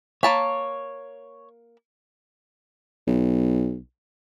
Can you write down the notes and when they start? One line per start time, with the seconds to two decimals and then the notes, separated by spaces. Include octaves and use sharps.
0.23 A#3 C#5 A5 B5
3.07 B1